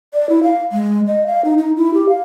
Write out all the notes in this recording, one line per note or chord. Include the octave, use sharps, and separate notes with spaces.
D5
E4
F5
G#3
D#5
F5
D#4
D#4
E4
G4
F5